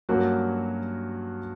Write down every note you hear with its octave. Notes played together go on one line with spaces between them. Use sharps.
G2 F#3 A#3 C#4 F#4 A#4